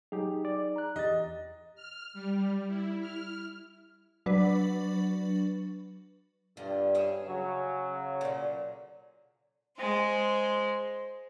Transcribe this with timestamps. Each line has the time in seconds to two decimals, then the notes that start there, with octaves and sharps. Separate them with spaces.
0.12 F#3 D#4 G4 G#4
0.45 D5
0.76 A#5 F#6
0.96 E2 G4 D#5 A6
1.75 F6
2.13 G3
2.68 E4
3.01 F6
4.26 F#3 D4 B4
6.57 G2 D3 F4
6.95 C#4 G#4 E5
7.28 C#3 F#3
8.21 A#2 D3
9.77 G#3 C5